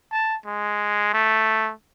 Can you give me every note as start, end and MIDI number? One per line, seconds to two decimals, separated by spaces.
0.12 0.36 81
0.46 1.11 56
1.14 1.71 57